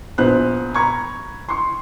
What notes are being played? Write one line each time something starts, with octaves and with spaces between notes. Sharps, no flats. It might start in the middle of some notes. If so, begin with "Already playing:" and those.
A#1 B3 C5 F#6
A#5 B5 C#6 G#6
C6 C#6